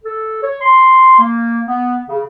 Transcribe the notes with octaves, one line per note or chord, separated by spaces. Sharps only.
A4
C#5
C6
A#3
B3
C#3